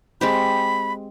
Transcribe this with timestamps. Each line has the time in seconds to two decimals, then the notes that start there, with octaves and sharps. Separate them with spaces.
0.21 G#3 C4 G4 B5